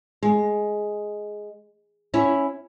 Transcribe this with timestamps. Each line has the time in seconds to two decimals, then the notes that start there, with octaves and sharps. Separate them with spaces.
0.23 G#3
2.14 C#4 E4 C#5